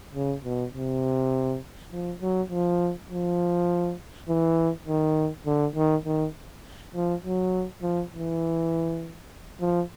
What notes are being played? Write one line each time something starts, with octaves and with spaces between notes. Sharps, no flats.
C#3
B2
C3
F3
F#3
F3
F3
E3
D#3
D3
D#3
D#3
F3
F#3
F3
E3
F3